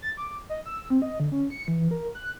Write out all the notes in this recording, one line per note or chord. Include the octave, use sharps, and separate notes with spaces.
A6
D6
D#5
E6
C4
D#5
D3
C#4
C#7
E3
A#4
F#6